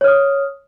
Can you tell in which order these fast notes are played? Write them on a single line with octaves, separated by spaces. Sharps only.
C#5 F6 D#6